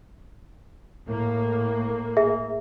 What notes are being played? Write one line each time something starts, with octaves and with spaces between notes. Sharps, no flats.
A2 A#3
G#4 E5